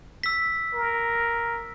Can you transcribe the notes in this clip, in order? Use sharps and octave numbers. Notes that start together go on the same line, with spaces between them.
E6 B6
A#4